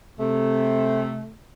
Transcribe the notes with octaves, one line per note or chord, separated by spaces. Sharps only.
C3 A3